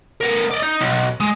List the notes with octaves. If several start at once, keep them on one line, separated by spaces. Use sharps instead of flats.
B3 A#4
D5 D#5
D#4
B1
G#3